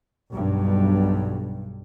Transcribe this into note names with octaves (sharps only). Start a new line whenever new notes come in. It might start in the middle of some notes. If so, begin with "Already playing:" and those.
B1 G2